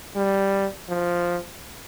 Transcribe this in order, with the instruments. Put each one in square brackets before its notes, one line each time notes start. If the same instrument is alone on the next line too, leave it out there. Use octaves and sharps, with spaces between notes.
[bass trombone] G3
F3